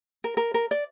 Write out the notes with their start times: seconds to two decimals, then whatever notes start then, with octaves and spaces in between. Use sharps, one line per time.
0.24 A#4
0.37 A#4
0.54 A#4
0.71 D5